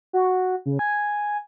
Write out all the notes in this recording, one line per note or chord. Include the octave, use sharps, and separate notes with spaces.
F#4
C#3
G#5